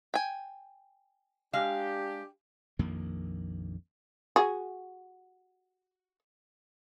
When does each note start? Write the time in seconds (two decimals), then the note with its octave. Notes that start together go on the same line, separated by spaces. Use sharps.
0.14 G5 G#5
1.53 G#3 D4 G4 F5
2.79 A#1 F2 D#3 A#3
4.36 F#4 G#4